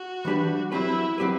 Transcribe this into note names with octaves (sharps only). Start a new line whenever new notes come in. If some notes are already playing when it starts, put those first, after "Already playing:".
Already playing: F#4
E3 G3 D4 G4 B4
F#3 C4 E4 G4 B4
F#3 C4 G4 B4